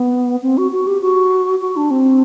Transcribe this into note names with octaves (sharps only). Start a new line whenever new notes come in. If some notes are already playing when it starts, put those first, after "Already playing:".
Already playing: B3
C4
F#4
F#4
G4
F#4
F#4
D4
C4